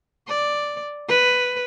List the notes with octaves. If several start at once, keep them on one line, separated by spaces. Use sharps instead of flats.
D5
B4